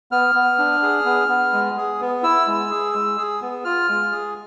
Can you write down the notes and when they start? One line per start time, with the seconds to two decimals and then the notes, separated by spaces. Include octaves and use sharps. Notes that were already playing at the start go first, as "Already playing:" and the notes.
0.11 B3 F6
0.35 B3
0.58 D4
0.83 G#4
1.06 B3
1.29 B3
1.53 G#3
1.77 G#4
2.01 B3
2.23 E4 E6
2.47 G#3
2.70 G#4
2.94 G#3
3.18 G#4
3.42 B3
3.64 F4 F6
3.89 G#3
4.12 G#4